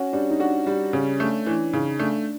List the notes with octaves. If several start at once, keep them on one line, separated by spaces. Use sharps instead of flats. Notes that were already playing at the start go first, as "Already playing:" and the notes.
Already playing: C#4 F#4
G3 D4
D#4
D4 F#4
G3
C#3 C#4
A3 D4
E3 D4
C#3 D#4
A3 D4